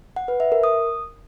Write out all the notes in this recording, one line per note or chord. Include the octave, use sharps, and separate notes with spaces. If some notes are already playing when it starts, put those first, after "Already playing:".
F#5
B4
E5
A#4
D#6